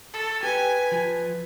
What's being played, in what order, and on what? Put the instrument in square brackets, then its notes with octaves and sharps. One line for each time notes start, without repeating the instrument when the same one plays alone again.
[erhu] A4
[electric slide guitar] G4 [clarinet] B4 [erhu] G#5
[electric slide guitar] F3